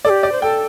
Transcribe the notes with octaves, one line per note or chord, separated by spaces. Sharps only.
A4 D5
G4
D5
C5
A4 G5